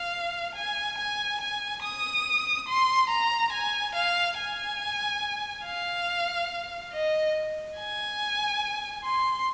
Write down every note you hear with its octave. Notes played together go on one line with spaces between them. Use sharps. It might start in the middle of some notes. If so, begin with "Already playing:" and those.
Already playing: F5
G#5
G#5
G#5
D#6
C6
A#5
G#5
F5
G#5
F5
D#5
G#5
C6